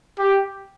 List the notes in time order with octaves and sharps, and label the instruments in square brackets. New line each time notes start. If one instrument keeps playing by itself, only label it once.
[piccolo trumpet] G4